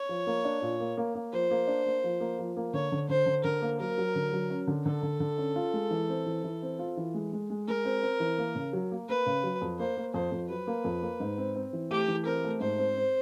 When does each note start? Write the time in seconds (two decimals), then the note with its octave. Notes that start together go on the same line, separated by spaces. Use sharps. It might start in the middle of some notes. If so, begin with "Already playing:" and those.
Already playing: C#5
0.09 F3
0.27 A#3
0.45 D4
0.62 A#2
0.80 A#3
0.97 A#3
1.15 A#3
1.33 F3 C5
1.51 A#3
1.68 D4
1.86 A#3
2.04 F3
2.20 A#3
2.39 F3
2.57 A#3
2.73 D3 C#5
2.92 D3
3.09 D3 C5
3.26 D3
3.44 D3 A#4
3.62 A#3
3.80 F#3 A#4
3.98 F#3
4.15 D3
4.32 F#3
4.50 C#4
4.67 D3
4.85 D3 A4
5.03 D3
5.20 D3
5.38 C#4
5.56 F4
5.73 G#3
5.91 E3
6.09 C4
6.26 E3
6.44 E3
6.62 C4
6.79 F4
6.97 E3
7.14 G#3
7.33 G#3
7.50 G#3
7.67 G#3 A#4
7.85 C4
8.03 C4
8.20 E3
8.38 A#3
8.55 C#3
8.73 F#3
8.91 A#3
9.09 A#3 B4
9.26 C#3
9.44 F#3
9.61 F2
9.79 A#3 C5
9.97 A#3
10.14 F2 C5
10.32 F2
10.50 F#3 B4
10.67 A#3
10.84 F2
11.02 A#3
11.20 G#2
11.38 C4
11.56 C4
11.73 E3
11.91 A3 G4
12.08 E3
12.26 C4 A#4
12.44 A3
12.61 G#2 C5
12.78 C4
12.96 C4